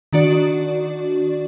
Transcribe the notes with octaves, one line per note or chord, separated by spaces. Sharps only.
D#3 D4 F#4 D5